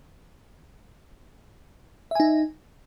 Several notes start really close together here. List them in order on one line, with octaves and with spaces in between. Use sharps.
E5 G#5 D#4